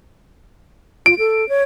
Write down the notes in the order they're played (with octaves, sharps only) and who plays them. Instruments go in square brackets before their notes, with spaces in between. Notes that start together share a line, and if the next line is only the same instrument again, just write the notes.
[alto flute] F4 [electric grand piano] D7
[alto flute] A4
C#5